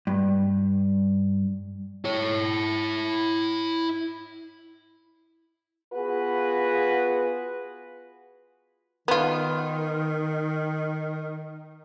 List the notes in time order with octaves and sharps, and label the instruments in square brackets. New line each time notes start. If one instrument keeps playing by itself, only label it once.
[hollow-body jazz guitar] G2
[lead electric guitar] E4 C#5
[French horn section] B3 F4 F#4 G#4 B4
[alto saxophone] D#3 [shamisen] B3 F4